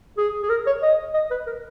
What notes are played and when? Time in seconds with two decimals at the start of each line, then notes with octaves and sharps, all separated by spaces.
0.17 G#4
0.43 G#4
0.49 A#4
0.66 C#5
0.82 D#5
1.14 D#5
1.31 B4
1.47 A#4